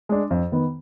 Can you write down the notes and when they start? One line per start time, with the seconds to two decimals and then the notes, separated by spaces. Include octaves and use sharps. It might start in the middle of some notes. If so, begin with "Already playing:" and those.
0.09 G#3 D4
0.31 F2
0.52 D#3 B3